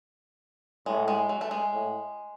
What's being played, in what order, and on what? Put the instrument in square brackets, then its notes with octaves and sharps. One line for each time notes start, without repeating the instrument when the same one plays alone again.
[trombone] A2 [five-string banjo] G#3
[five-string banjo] G#3
F#3
A3
G#3
[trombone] A2